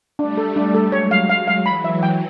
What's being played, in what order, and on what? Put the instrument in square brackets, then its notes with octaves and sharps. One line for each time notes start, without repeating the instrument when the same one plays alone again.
[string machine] G3 A3 [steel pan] D4
[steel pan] A4
D4
A4
[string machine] F#3 G#3 [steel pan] C#5
[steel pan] F5
F5
F5
[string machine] E3 F#3 [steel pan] B5
[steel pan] E5
G5